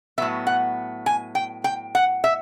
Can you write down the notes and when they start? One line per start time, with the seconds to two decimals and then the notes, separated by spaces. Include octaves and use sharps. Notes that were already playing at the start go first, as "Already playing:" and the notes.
0.18 A2 F#3 B3 E5
0.47 F#5
1.06 G#5
1.35 G5
1.64 G5
1.95 F#5
2.24 E5